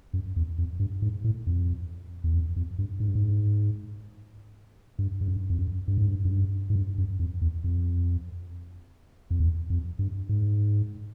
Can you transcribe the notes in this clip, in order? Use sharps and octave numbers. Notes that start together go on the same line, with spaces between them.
F#2
E2
F2
G2
G#2
A2
F2
E2
F2
F2
G2
G#2
G2
G#2
G2
G2
F#2
F2
F#2
G2
G#2
G2
F#2
G2
G#2
G2
F#2
F2
E2
F2
F2
E2
F2
G2
G#2